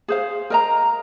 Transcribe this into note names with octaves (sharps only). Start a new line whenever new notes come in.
G#4 C5 F5
A#4 D#5 A#5